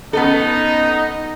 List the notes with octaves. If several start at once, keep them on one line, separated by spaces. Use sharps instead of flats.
B3 C#4 D#4 A4